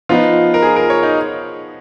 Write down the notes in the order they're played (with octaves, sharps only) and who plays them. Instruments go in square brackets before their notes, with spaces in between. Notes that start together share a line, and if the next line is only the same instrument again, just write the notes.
[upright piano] F3 B3 D#4 [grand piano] F4
[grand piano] A#4
G#4
A#4
C#5
D#4